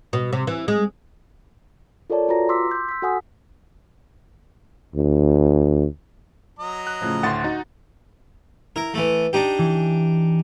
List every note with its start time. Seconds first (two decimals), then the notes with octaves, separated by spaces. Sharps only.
0.13 B2
0.33 C3
0.47 E3
0.68 G#3
2.10 F4 A4 A#4 C#5 D5 A5
2.28 F4 F#4 B4 A#5 A#6
2.49 C6 D6 E6 B6
2.71 C6 G6
2.89 E6 B6
3.02 F#4 A4 F#5 G#5 D#6
4.95 D2
6.59 F#3 D#5 A#5
6.87 F#6
7.01 A2 C#3 F3
7.23 D2 A2 F#5 C6 A6
7.44 D#4 F#4
8.76 E4 A#4
8.94 E3 A3
9.33 D4 D#4 G4
9.58 E3